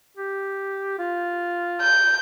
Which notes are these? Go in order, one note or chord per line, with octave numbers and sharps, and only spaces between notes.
G4
F4
G6